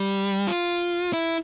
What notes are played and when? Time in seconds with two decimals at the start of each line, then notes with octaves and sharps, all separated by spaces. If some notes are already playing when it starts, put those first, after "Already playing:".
Already playing: G3
0.47 F4
1.13 E4